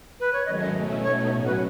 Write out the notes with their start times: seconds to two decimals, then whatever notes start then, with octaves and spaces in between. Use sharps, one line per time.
0.20 B4
0.33 C#5
0.46 G#2 D#3 F#3 A3 C#4 D#5
0.60 D#5
0.75 B2 A3 C#4 E4
1.02 B2 A3 D#4 C#5
1.31 A2 F#3 C#4 F#4 C#5
1.46 B4